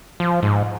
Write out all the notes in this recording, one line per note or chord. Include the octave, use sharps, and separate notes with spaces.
F3
G#2